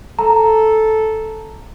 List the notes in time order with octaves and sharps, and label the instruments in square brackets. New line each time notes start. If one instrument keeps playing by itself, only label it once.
[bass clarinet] A4 [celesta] A#5